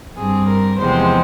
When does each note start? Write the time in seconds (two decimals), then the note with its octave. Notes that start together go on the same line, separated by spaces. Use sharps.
0.17 G2 G3 C4 G#4
0.48 A#4
0.79 E2 C3 F3 G#3 C4 C5